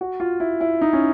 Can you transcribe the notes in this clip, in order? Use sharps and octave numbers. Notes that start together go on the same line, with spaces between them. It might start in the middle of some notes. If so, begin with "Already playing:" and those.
F#4
F4
E4
E4
D#4
C#4